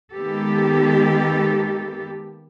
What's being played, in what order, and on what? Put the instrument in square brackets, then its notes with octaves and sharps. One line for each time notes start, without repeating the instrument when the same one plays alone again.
[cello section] D#3 G#3 A#3 B3 G4 A4